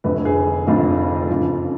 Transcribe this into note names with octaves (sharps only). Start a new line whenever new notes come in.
F1 F2 D3 B4
G#4
F1 F2 D3 F4
F#2 C#3 F3